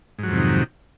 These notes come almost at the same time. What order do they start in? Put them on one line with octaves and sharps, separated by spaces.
G#2 F#3 F2 C3 D#3